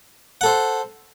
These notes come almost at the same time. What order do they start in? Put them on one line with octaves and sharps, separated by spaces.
F#5 A4 C5